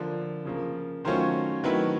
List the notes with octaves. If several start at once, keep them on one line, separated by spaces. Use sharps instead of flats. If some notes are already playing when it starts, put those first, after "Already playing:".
Already playing: D3 F3 A#3
C#3 F3 A#3
D#3 F#3 A3 C#4 F4 C5
D#3 F#3 A3 C4 E4 B4